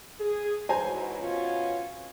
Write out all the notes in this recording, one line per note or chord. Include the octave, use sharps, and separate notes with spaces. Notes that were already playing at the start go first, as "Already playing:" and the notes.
G#4
G#2 E3 F#3 C5 G#5 A#5
B2 C#4 F4